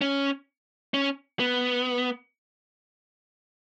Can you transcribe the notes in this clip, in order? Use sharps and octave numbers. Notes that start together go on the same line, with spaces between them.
C#4
C#4
B3